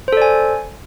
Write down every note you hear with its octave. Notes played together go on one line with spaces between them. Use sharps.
A4 C5 D5 G#5